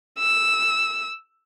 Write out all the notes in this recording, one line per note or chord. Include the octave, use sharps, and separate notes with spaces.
E6